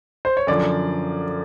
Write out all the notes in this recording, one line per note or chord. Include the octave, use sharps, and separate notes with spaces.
C5
C#5
F#2 D3 F3 D5